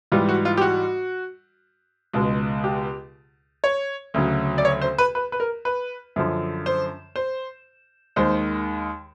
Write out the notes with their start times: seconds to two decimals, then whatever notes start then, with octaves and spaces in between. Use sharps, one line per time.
0.12 G#2 E3 G3 F4
0.29 F#4
0.45 F4
0.57 G4
0.61 F#4
2.14 C#2 B2 G#3
2.64 G4
3.64 C#5
4.14 D2 C#3 F#3
4.58 D5
4.65 C#5
4.82 C5
4.98 B4
5.15 B4
5.32 B4
5.40 A#4
5.65 B4
6.16 F#2 D3 F3
6.66 C5
7.16 C5
8.16 D#2 D#3 G#3 C5